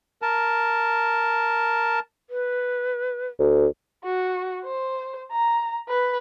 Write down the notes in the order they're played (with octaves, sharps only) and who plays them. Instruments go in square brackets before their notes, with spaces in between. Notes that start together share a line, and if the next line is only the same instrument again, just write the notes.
[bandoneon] A#4 A5
[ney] B4
[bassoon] D2
[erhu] F#4
C5
A#5
B4